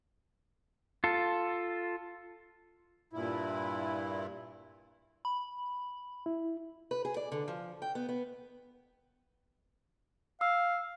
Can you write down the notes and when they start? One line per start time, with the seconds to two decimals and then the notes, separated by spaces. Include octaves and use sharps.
1.04 F4 A4
3.13 G2 A#2 E4
5.25 B5
6.26 E4
6.91 B4
7.05 G#4
7.17 D5
7.32 D3
7.48 F3
7.82 G5
7.95 B3
8.09 B3
10.41 F5 E6